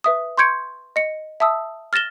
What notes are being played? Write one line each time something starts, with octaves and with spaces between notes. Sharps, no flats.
B4 E5 D#6
C6 C#6 G6 G#6 C#7 D7
D#5 C#7
E5 A5 D#6 E6
F6 A6 A#6 E7 G7